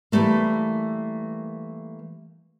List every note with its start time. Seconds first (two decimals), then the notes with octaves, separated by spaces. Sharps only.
0.12 E3 F3 G3 A3 A#3